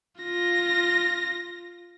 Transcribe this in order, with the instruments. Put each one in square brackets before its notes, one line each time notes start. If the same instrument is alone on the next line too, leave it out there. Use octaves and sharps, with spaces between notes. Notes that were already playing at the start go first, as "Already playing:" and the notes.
[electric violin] F4 A#6